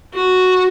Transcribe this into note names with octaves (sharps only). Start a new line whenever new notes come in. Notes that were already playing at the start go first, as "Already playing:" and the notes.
F#4